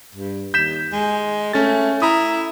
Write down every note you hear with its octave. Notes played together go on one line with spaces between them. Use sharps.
G2
D#2 G6 B6 E7
G#3
A3 C#4 A6
E4 A#5 B5 D#6